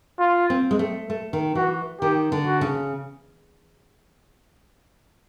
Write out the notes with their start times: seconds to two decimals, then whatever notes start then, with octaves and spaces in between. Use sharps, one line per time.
0.19 F4
0.50 C4
0.71 G#3
0.79 A3
1.10 A3
1.33 D#3
1.55 E3 F#4
2.01 D#3 G4
2.32 D3
2.47 F#4
2.61 C#3